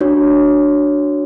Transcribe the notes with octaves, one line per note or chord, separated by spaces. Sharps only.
D4 F#4 C#5